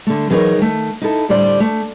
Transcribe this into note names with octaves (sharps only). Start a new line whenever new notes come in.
D3 A3
E3 F#3 D#4 G#4 A#4 C#5
D#3 A3
D#4 E4 A4
D2 A2 G3 C5 D5
A3